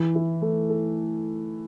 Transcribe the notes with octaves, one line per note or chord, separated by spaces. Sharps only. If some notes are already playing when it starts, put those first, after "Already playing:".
Already playing: E3
E4
A3
A4